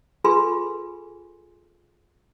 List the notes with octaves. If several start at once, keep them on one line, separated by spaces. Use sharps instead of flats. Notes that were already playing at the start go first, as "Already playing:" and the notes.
F4 G#4 A4 B4 G#5 C6